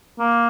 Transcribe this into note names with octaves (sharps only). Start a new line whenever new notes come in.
A#3